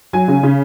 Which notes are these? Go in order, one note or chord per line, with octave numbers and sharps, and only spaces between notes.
F#3 G#5
C#3
C#3